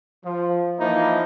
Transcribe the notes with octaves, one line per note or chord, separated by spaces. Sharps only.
F3
E3 F3 A#3 D#4 E4